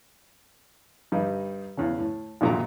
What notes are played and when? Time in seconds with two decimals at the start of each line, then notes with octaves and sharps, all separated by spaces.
1.12 G2 G3 D#4
1.77 E2 C#3
1.98 A2
2.41 G#1 F#2 A#2 D#3 A#5